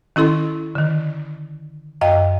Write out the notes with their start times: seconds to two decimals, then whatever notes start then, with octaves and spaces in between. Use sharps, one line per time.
0.16 D#3 C#4 E4 A4 C6
0.75 D3 D#3
2.01 F#2 D#5 F5 G5